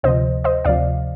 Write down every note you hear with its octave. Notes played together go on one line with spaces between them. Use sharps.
D2 C3 F3 C5 D#5
C5 D#5
D2 C3 F3 D5 F5